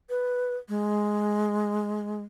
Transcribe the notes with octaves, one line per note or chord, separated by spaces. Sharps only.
B4
G#3